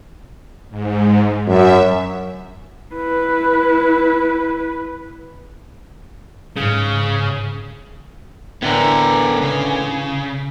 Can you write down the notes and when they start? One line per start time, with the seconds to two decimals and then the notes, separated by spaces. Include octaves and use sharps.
0.70 G#2
1.47 F#2 E5
2.95 E4 B4
6.56 G#2 C#3
8.62 A2 D3 E3 B3 A#4
9.41 C#3